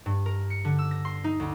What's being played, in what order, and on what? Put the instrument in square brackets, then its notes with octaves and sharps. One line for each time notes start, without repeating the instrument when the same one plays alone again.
[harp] G2
A#4
C#7
D3
E6
A#6
C6
D#4
D2